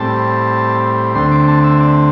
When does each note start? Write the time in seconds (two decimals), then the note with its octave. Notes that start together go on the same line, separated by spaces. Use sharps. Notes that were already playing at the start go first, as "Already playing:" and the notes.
Already playing: A2 G3 C4 A5
1.15 D2 D3 A3 C4 C6
1.32 D6
1.48 A5
1.64 E5
1.80 D5